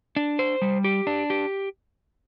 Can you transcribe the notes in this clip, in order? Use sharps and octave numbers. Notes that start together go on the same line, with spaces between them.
D4
C5
G3
G4
D4
G4